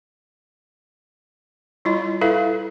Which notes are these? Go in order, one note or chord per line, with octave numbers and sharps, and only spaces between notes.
G3 E4 F4 D#5
E4 A4 B4 E5 F5